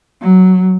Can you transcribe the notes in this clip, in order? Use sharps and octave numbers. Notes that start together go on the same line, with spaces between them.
F#3